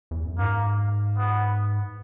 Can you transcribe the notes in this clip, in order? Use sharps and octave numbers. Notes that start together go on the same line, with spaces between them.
E2
F#2
G#2 A#3
B3